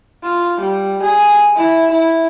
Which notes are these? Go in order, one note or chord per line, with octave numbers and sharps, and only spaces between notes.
F4
G3
G#4
E4
E4